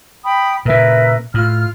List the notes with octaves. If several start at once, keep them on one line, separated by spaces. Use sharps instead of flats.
G5 B5 D#6
A#2 C#3 A#4 B4 E5
A2 F4 F6